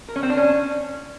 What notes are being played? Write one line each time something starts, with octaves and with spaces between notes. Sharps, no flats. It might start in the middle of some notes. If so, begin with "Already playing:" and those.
A#4
C#4
C4
D4
C#4